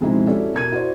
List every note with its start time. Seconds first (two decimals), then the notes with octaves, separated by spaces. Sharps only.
0.01 F2 B2 G#3 C4 D#4 E4
0.27 C#4 E4 F#4 G4 A4 D5
0.53 B2 A#4 G#6 D#7
0.72 E4 F#4 C5 D5